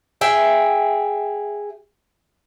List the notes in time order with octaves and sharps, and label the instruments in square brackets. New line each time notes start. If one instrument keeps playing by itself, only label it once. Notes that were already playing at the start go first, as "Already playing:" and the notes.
[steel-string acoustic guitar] G#4 E5 G5